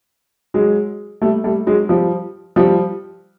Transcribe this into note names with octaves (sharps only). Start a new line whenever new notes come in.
F#3 G#3
G3 A3
G3 A3
F#3 G#3
F3 G3
F3 G3